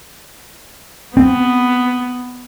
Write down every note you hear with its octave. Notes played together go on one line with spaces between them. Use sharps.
B3 C4